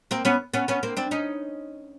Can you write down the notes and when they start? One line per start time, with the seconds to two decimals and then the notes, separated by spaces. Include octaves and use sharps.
0.11 A#3 C4
0.25 B3 C#4
0.54 B3 C#4
0.68 B3 C#4
0.83 A#3 C4
0.97 C4 D4
1.11 C#4 D#4